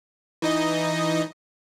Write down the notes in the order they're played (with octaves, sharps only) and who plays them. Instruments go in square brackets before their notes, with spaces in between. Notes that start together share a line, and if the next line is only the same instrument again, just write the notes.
[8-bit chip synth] E3 D#4 D#5